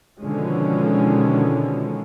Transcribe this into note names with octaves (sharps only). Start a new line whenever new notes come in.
B2 D3 D#3 F3 G#3 C#4